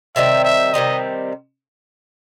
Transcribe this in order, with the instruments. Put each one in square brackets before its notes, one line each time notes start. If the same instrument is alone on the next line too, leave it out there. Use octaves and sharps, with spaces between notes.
[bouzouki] C3 D#3 G3 C4 [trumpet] E5
[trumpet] E5
[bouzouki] C3 D#3 G3 C4 [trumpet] D#5